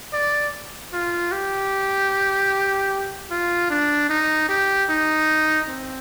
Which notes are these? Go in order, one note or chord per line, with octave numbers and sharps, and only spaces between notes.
D5
F4
G4
F4
D4
D#4
G4
D#4
C4